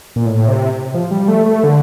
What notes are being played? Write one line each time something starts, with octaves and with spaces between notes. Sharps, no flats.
A#2
A2
C3
F3
G3
A3
A3
D3